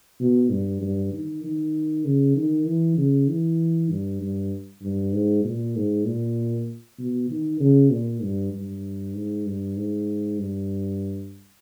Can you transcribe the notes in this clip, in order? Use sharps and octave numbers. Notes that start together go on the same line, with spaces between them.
B2
G2
G2
D#3
D#3
C#3
D#3
E3
C#3
E3
G2
G2
G2
G#2
A#2
G#2
A#2
B2
D#3
C#3
A#2
G2
G2
G#2
G2
G#2
G2